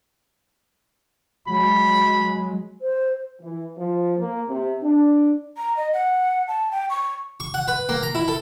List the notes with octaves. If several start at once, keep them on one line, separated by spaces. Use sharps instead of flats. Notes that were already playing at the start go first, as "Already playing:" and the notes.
F#3 G#3 B5
C5
E3
F3
A#3
C3
D4
A#5
D#5
F#5
A5
G5
C#6
C#6
F#5
B4
A#3
A#5
E4
A4